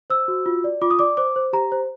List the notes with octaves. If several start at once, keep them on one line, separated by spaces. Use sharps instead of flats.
C5 E6
F#4
F4
D5
F4 D6
D#6
D5 D6
C5 D6
C5
G4 A#5
C5